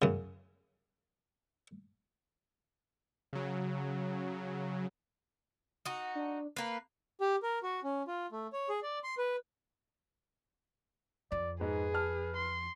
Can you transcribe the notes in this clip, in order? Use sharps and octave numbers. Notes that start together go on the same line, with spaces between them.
F#2 C#3
C#3 F#3
D#4 F#4
D4
A#3 B4 C7
G4
A#4
F#4
C#4
F4
A3
C#5
G#4
D5
C6
B4
F2 D5
G#2 G#4 B4
A5 F6
C6